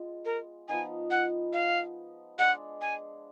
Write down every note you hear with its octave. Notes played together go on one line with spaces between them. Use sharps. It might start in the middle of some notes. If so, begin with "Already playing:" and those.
Already playing: G#3 B3 F4
A#4
F3 B3 D#4 G#5
F#5
F5
G#3 D4 G#4 F#5
G#5